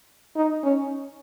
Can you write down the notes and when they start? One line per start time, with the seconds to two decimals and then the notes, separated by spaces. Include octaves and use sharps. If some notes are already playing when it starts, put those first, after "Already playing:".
0.36 D#4
0.64 C#4